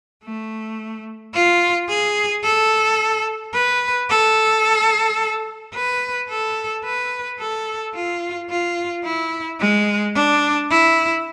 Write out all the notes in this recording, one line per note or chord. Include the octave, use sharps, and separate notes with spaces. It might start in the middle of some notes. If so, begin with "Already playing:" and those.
A3
F4
G#4
A4
B4
A4
B4
A4
B4
A4
F4
F4
E4
G#3
D4
E4